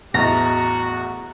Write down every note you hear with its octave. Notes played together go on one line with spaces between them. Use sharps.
A1 E2 B3 F#4 D#5 A#5 C#6 A6